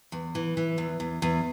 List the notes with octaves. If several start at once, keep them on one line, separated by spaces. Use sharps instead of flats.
E2
E3
E3
E2
E2
E2